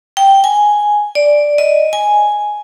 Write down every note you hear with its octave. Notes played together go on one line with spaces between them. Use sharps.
G5
G#5
D5
D#5
G#5